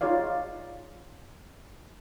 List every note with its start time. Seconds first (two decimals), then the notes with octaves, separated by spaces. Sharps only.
0.01 D#4 F4 G#4 C#5 D5 F5